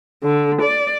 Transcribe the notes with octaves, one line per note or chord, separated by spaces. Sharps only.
D3
D5